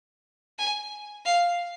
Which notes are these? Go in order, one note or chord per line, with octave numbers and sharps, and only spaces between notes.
G#5
F5